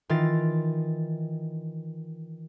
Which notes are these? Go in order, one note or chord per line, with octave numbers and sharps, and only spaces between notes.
D#3 E3 F4 A6